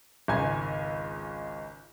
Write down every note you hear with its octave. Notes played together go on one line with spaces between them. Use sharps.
G#1 C#2 G#5 G#6